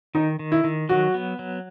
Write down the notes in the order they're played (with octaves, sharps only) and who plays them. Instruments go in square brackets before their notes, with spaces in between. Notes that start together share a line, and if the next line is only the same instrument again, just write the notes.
[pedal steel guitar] D#3 [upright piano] D#4
[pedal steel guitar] D#3
[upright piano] E4
[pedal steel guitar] D#3
[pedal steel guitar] F#3 [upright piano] F#4
[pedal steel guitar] B3
F#3